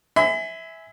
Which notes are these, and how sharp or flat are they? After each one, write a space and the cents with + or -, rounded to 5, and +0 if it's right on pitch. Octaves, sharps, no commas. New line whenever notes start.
E5 -15 G#5 +0 B5 +40